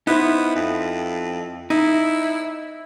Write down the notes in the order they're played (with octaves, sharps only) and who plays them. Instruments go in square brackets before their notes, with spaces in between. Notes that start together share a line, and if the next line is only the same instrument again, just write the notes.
[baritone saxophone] B3 [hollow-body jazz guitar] D#4 E4 C5
[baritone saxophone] F2
[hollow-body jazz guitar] D#4 [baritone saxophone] E4